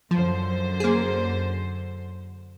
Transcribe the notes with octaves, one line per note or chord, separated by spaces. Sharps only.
F#2 D3 F3 C5
A#3 G#4